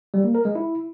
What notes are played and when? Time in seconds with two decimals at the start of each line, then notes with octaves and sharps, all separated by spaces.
0.14 G3
0.24 A#3
0.35 A#4
0.45 G#3
0.55 E4